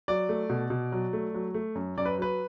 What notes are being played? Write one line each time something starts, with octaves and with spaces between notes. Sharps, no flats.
F#3 D5
A3
B2
B2
F#3
A3
F#3
A3
F#2
F#2 D5
B4
F#3 B4